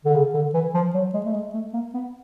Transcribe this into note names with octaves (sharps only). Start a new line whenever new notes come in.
D3
C#3
D3
E3
F3
F#3
G#3
A3
G#3
A3
A#3
B3